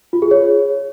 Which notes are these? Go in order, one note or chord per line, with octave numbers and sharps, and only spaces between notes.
F4
G#4
C#5